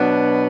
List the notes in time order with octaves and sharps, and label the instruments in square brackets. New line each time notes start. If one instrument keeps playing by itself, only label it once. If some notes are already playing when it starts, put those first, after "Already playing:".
Already playing: [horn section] B2 F#3 B3 D4